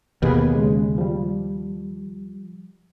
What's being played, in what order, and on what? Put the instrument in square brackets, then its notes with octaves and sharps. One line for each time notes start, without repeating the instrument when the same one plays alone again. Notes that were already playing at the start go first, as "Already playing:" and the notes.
[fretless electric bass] D#2 B2 [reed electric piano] B3 G#4 B4
[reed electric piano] C#3 G#3
F3 G3